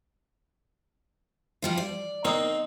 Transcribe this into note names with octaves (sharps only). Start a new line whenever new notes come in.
F3 G3 F4
D5
A#3 C4 D#4